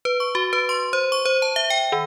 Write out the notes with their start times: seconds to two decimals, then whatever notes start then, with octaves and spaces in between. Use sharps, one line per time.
0.05 B4
0.20 C#6
0.35 F#4
0.53 B4
0.69 C6
0.93 C5
1.12 C#6
1.25 C5
1.42 A5
1.56 E5
1.70 G5
1.92 D#3